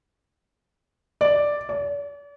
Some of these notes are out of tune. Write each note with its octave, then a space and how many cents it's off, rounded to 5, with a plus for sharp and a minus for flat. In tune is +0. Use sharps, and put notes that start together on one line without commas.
D5 +0
D5 -40